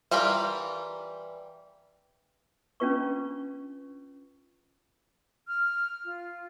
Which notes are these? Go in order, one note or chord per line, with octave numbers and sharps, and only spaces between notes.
E3 G3 F4 A#4 B5
C#4 D4 F4 B4 C#6
F6
F4